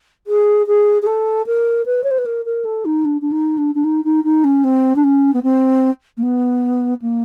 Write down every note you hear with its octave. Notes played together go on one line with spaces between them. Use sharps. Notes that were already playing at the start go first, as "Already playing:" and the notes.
G#4
G#4
G#4
A4
A#4
B4
C#5
C5
B4
A#4
A#4
A4
D#4
D4
D4
D#4
D4
D4
D#4
D#4
D#4
C#4
C4
D4
C#4
B3
C4
A#3
B3
A#3